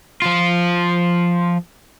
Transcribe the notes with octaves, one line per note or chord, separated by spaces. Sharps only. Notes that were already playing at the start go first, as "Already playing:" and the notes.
F3 F4